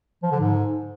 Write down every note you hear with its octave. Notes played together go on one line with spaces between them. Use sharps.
F3
D3
G#2